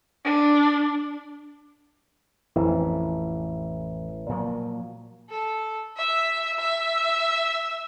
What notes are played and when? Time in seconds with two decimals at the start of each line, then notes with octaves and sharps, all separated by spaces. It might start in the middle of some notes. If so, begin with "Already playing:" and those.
0.24 D4
2.56 A1 F2 E3
4.29 A#2 F3 F#3
5.30 A4
5.97 E5
6.59 E5